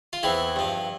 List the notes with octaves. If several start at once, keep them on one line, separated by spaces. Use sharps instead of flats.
F4
E2 E3 C4 E4
G2 F3